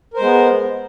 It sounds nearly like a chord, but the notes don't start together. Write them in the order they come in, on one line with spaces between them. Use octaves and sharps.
A#4 C5 G#3 B3